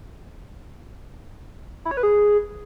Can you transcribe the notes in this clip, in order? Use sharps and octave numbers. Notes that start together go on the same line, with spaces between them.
E4
C#5
B4
G#4